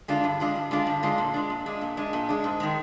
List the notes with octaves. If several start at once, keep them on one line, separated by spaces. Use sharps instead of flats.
D3 G#3 D4 F4
G2
D3 G#3 D4 F4
G2
D3 G#3 D4 F4
G2
D3 G#3 D4 F4
A#2
G#3 D4
A#2
G#3 D4
A#2
G#3 D4
A#2
G#3 D4
G#2
D#3 G#3